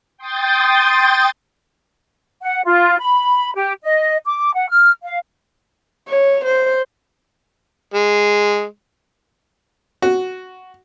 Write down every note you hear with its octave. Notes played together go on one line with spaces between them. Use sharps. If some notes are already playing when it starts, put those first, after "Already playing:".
G5 C6 D#6 G6 A6
F#5
F4
B5
G4
D#5
D6
F#5
F6
F5
C#5
C5
G#3
F#4